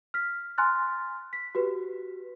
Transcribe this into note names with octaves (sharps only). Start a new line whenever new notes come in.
F6 B6
G#5 A#5 C6 F6 F#6 A6
B6
F#4 G4 B4